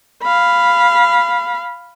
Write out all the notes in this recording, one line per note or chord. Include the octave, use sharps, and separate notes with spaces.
F5 B5